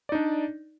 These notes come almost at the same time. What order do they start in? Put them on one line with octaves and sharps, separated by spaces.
D5 D#4 D4